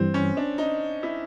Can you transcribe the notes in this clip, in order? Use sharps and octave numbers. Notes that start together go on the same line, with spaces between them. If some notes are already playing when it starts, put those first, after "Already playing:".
Already playing: G2 E3 G3 C4
C#4
D4
D#4
E4